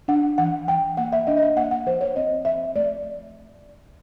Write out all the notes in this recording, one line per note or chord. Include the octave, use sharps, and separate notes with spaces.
D4 F#5
E3 F#5
E3 G5
A#3 F#5
E5
D4 D#5
D#5
E5
A#3 F#5
F#5
F3 C5
C#5
C4 D#5
F3 E5
A3 D5